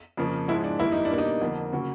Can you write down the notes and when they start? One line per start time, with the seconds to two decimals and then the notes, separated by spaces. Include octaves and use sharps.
0.17 F2 C#3 F3 A#3
0.48 G#2 F3 G#3 E4
0.64 D4
0.79 G2 D#3 G3 A#3 E4
0.92 D#4
1.05 D4
1.10 B2 G3 A#3
1.18 D#4
1.41 F2 D3 F3 A#3
1.73 C#3 F#3 A#3